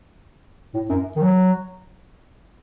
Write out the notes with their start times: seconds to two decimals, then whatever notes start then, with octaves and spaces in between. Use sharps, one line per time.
0.74 A2
0.89 F#2
1.16 D#3
1.21 F#3